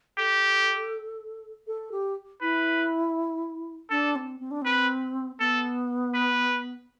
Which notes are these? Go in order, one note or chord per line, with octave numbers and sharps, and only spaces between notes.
G4 A4
A4
G4
E4 B4
D4 A4
C4
C4
D4
C4 B4
B3 A4
B4